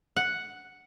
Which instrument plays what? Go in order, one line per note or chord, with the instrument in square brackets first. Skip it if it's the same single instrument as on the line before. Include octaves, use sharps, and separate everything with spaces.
[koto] F#5